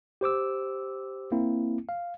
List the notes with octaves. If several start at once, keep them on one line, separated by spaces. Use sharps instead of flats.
G4 C5 D6 E6
A#3 C4 E4
F5